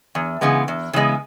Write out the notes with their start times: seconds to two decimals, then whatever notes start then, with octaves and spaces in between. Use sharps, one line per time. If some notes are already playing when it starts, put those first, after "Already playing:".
0.15 E2
0.41 C#3 E3 G#3 B3
0.68 E2
0.93 C#3 E3 G#3 B3